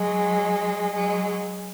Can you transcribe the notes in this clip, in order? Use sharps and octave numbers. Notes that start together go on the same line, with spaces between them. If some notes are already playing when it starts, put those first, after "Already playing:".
Already playing: F#3 G#3
F#3 G#3